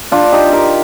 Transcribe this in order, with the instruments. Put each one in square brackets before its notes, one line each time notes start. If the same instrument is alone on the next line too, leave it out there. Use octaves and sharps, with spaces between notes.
[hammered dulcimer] D4 F4
D#4 G4
G4 A#4